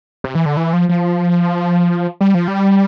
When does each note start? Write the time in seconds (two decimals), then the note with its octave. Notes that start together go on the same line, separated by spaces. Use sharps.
0.24 C3
0.35 E3
0.46 D3
0.57 E3
0.73 F3
0.89 F3
2.21 G3
2.34 F3
2.48 G3